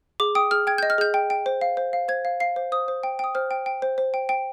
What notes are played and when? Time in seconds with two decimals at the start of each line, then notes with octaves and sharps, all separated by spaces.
0.20 G#4 D6
0.35 G5 D#6
0.51 G#4 F6
0.67 G5 G#6
0.78 D#5 G6
0.90 F6
0.98 G#4 G6
1.14 G5
1.30 G5
1.46 C5
1.61 F5
1.77 C5
1.93 F5
2.08 C5 G#6
2.25 F5
2.40 F5 C7
2.56 C5
2.72 C5 D#6
2.88 C5
3.03 G5
3.19 G5 D#6
3.35 C5 F6
3.51 G5
3.66 G5
3.82 C5
3.98 C5
4.14 G5
4.29 G5